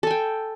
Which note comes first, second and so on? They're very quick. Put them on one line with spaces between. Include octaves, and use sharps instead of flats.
A4 G#5 G5